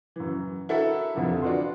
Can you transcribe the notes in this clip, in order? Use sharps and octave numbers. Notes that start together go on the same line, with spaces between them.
F#2 E3
E4 F#4 A4 A#4 E5 F#5
C2 F2 D3 E3
D4 F4 F#4 B4 C6